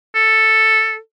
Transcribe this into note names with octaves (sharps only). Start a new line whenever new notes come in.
A4